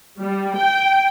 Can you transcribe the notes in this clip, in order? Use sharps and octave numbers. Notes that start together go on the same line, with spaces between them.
G3
G5